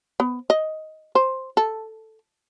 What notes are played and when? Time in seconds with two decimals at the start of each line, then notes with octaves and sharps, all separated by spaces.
0.20 B3
0.50 D#5
1.15 C5
1.57 A4